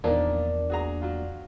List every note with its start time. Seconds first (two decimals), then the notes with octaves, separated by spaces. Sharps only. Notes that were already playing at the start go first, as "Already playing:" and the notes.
0.04 E2 A#2 D#3 F3 A#3 D4 D5
0.70 F#4 G#4 A#5
1.01 F#3 F4